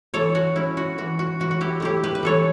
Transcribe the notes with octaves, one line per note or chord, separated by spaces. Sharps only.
E3 A4 C#5
F#4
C#4 E4
F#4
E3 F#4
F#4
E3 F#4
F#4
E4 G4
A3 E4 G4
G4 B4
B4
E3 A4 C#5